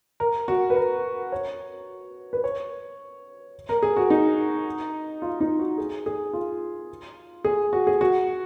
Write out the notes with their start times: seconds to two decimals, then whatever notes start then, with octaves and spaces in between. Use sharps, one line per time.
0.20 A#4
0.48 F#4
0.70 B4
0.76 A#4
1.32 C#5
2.33 B4
2.44 C#5
3.69 A#4
3.83 G#4
3.97 F#4
4.10 D#4
5.22 F4
5.40 D#4
5.59 F#4
5.78 G#4
6.06 G#4
6.33 F4
7.45 G#4
7.73 F#4
7.87 G#4
8.01 F#4